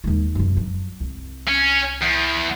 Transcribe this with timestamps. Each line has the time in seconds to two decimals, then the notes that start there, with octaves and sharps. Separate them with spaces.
0.04 D#2 G#3
0.35 F#2 C3
0.57 F#3
1.01 C2
1.48 C#4
2.01 E2